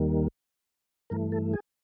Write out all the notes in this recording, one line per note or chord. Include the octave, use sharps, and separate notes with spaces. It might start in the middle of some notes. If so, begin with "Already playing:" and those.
Already playing: D#2 D#3 G3 A#3
G2 E3 A3 A#4
A4
G#4